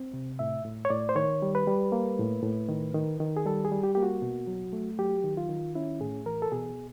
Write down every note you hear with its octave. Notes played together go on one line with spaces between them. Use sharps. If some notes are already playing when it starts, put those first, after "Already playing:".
Already playing: C4
C3
A2 E5
A2
C#5
A2 D5
C5
D#3 C#5
G3
B4
G3
A#3
A2
A2
D#3
D#3
D#3
G#4
G3 A4
G#4
G3
G4
A#3 G4
F#4
B2
F#3
A3
F#3 G4
D#3
F4
D#3
C#4 E4
A2 G#4
E3 A#4
A4
B2 G#4